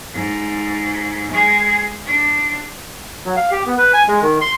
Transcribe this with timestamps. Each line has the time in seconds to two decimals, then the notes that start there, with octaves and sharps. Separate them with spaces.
0.14 G#2
1.32 G#3 G#4
2.06 D4
3.25 F#3
3.37 F5
3.51 G4
3.66 B3
3.78 B4
3.93 G#5
4.08 G#3
4.22 D#3
4.41 C6